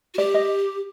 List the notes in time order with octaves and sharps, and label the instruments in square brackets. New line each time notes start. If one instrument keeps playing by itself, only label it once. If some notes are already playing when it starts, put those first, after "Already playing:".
[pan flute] F#4
[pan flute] G4 [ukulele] D5
[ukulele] D#5